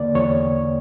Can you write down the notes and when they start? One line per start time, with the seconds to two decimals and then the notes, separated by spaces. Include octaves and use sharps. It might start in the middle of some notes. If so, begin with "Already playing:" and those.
Already playing: E2 D3 A#3 D5
0.15 E2 C#5